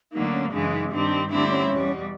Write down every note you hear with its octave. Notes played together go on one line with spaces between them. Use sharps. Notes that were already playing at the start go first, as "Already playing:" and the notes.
D2 D3 F#3 A#3 D#4
C#4
F#2 C#3 E3 G#3 D4
D#4
G2 D#3 G3 C4 D4
D2 D3 G3 C4 D4 E4
C#4
E2 B2 G3